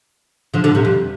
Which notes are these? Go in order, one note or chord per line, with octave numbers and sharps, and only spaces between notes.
D3 F3
B2 D3
C3
F2